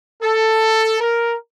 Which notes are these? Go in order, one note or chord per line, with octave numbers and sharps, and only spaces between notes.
A4
A#4